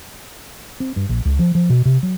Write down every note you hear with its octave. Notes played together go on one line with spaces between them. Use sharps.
C4
G2
A#1
C#2
F3
F3
B2
C3
F#3